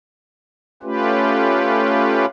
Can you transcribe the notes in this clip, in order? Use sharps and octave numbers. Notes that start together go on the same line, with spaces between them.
A3 C#4 F4 G4 B4